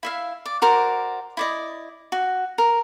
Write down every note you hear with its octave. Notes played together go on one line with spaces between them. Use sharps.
E4 E5 F5
D5
F#4 A#4 C5 D5
E4 D5 D#5
F#4
A#4